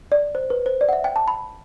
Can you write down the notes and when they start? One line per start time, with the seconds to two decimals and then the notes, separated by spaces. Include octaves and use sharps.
0.12 D5
0.35 C5
0.50 B4
0.66 C5
0.81 D5
0.89 F#5
0.93 E5
1.04 G5
1.16 A5
1.28 B5